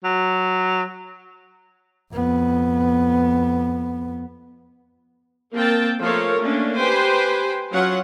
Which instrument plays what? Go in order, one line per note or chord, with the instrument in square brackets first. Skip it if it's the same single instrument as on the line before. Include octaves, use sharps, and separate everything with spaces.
[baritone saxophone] F#3
[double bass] F2 B3
[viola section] A#3 C4 A#4 G5 A5
F3 A3 A#3 A4 A#4 C#5
A3 A#3 C#4 D4
G4 B4 C5 G5 G#5
F#3 C#4 F4 C#5 F#5